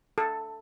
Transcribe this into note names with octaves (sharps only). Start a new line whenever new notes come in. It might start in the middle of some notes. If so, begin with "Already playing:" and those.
A4